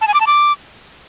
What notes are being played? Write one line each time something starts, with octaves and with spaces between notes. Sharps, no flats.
A5
G#5
D6
A5
D6